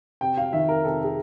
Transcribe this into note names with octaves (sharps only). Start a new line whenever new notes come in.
C3 G5
F5
D#3 E5
A#4
C3 A4
G#4